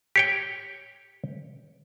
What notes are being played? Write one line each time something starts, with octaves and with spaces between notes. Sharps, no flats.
G4 C#5 G5